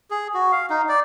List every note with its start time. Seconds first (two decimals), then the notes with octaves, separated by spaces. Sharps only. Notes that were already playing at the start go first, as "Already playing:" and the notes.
0.11 G#4
0.34 F#4
0.52 F5
0.70 D#4
0.89 D5